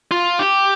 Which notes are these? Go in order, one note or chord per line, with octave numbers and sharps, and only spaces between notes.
F4
G4